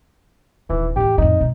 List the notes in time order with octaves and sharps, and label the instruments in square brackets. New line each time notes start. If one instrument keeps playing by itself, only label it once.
[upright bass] D#1 [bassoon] E3
[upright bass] E2 A2 [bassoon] G4
[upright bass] F2 A2 [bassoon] D#4
[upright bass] B2 G#3